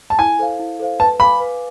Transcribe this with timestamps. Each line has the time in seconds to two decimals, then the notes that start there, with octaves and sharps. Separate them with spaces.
0.10 A5
0.19 E4 G#5
0.39 A4 C5 F5
0.59 E4
0.80 A4 C5 F5
0.99 B4 A5
1.20 F5 G#5 B5 D6
1.40 B4